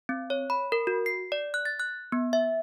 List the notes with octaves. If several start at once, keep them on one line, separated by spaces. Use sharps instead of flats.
C4
C#5
B5
A#4
F#4
C7
D5
F#6
A6
F#6
B3
E5